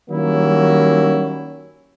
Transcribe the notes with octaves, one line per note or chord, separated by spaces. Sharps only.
D#3 F#3 G3 A#3 C#4 E4